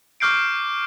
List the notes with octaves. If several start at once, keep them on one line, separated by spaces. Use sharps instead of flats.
C#6 D6 F6 G6 C7 D7